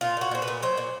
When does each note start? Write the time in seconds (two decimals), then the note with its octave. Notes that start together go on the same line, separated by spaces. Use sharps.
0.01 A#2 F4
0.17 A#2 F#4
0.31 A#2 C5
0.42 B4
0.48 A#2
0.62 F#3 C5
0.77 A#2